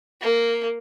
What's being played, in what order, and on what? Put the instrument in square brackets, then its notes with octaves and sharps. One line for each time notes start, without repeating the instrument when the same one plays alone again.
[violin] A#3